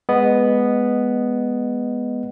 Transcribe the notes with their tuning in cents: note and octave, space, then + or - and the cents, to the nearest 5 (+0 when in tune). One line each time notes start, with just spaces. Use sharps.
G#3 +0 B3 +0 D#5 -10